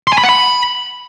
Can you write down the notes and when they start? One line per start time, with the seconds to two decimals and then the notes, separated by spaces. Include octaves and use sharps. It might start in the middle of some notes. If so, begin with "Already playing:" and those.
0.07 C6
0.13 G#5
0.18 B5
0.23 F#5
0.29 B5